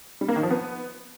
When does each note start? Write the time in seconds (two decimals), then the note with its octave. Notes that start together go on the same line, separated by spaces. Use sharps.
0.21 G3
0.28 A#3
0.36 D#3
0.43 F3
0.51 B3